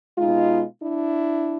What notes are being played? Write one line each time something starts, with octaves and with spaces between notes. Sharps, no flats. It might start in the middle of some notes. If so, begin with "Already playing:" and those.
B2 G#3 D#4 F4
D4 E4